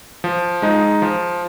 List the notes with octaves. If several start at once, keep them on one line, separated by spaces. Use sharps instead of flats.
F3
G#3 D#4
F3